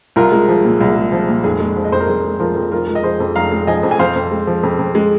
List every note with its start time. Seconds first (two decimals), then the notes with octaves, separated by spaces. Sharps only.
0.16 C2 F4 A#4
0.32 G#3
0.48 F3
0.64 A#2
0.81 C2
0.96 G#3
1.12 F3
1.28 A#2
1.44 F1 G#4
1.60 G#3
1.76 F3
1.84 D#5
1.92 F2 C5
2.00 A#4
2.08 F1 G#4
2.24 G#3
2.40 F3 F4 A#4
2.56 F2
2.72 F1 F4 A#4
2.88 G#3
2.95 D#5
3.03 F3 G#4 C5
3.20 F2
3.36 F1 F5 A#5
3.52 G#3
3.67 F3 D#5 G#5
3.83 F2
3.91 G#5
3.99 F2 C5 F5
4.15 F2
4.31 G#3
4.47 F3
4.63 F2
4.79 F2
4.95 G#3